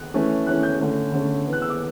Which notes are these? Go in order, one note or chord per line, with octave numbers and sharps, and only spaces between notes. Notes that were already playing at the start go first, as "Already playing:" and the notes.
Already playing: F#6
E3 A3 C#4
E3 A3 C#4 F#6
G6
D3 A3 C#4
D3 A3 C#4
E3 B3
F#6
E6
D6